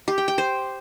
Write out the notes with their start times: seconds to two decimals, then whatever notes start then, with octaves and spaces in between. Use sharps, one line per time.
0.08 G4
0.18 G5
0.28 G5
0.38 C5